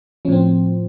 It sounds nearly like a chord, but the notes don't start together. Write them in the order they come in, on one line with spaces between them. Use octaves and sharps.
F3 C#4 A2 C4